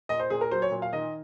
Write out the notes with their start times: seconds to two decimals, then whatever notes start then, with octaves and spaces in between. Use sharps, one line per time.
0.09 A#2 D#5
0.20 C5
0.30 A#2 G#4
0.41 A#4
0.51 F#3 C5
0.62 C#5
0.71 A#2
0.82 F5
0.93 D#3 D#5